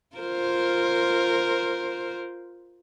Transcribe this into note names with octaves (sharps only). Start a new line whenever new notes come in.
F4 A#4 C5